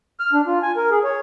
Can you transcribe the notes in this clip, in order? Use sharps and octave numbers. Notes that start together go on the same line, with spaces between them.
F6
D4
F4
G#5
A#4
G#4
C#5